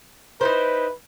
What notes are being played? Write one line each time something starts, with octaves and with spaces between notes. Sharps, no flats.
D#4 E4 B4 C5